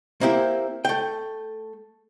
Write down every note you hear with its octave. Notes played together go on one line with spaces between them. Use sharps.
A#3 C4 E4 G4
A3 G5